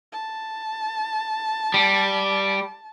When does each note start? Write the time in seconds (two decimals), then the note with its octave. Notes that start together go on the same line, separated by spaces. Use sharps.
0.12 A5
1.74 G3